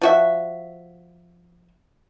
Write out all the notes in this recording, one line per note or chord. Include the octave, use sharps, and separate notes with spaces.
F3 F#4 E5